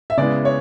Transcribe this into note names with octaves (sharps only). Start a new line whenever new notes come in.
E5
C#3 G#3 B3 E4 D5
C#5